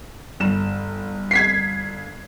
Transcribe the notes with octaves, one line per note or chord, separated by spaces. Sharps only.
G1 E7
G#6 B6 C7